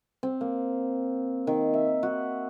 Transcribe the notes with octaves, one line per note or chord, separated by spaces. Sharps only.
C4
A#3
D#3
E5
F#4